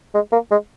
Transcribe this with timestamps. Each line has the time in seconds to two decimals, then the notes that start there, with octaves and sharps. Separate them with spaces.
0.15 G#3
0.33 A#3
0.51 G#3